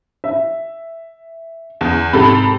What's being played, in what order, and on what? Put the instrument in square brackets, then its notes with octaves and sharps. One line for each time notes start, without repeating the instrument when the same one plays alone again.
[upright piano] E5
[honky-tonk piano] E2
[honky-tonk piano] G#2 A4 B5 [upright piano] C3